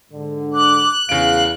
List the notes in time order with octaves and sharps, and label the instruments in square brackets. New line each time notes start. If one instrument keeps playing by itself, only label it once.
[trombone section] G#2 D3
[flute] D6 [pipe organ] F#6
[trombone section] E2 [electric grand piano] C#3 D7 [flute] F5